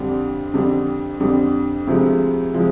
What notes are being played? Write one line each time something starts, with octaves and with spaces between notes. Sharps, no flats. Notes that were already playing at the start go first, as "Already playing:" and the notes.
Already playing: F2 D3 G3 D4
F2 D3 G3 D4
F2 D3 G3 D4
D2 C3 F3 G#3
C3 F3 G#3